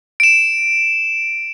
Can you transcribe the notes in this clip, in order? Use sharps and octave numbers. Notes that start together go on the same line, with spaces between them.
D7 E7